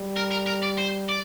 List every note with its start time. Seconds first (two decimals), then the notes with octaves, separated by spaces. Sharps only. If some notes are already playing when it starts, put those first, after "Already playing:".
Already playing: G3
0.16 A#4
0.31 A#4
0.46 A#4
0.62 D5
0.78 C5
1.09 D5